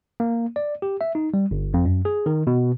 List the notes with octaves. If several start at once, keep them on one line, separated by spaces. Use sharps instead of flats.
A#3
D5
G4
E5
D#4
G3
G1
F2
F#2
G#4
D#3
B2